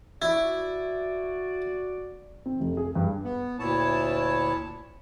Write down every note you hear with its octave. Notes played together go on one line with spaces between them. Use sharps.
E4 F#4 D5
C4
F1
G#4
G2
B3
D2 A#2 E4 C#5 A5